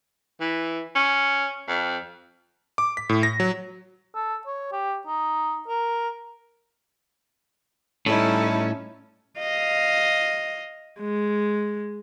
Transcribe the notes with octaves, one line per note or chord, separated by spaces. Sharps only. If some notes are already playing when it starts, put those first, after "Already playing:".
E3
C#4
F2
D6
B6
A2
A#6
F#3
A4
C#5
G4
D#4
A#4
A2 G3 C#4 D#4 E4 A4 E5
D#5 F5
G#3